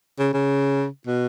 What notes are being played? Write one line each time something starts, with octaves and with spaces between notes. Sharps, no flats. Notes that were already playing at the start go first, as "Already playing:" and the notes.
C#3
C#3
B2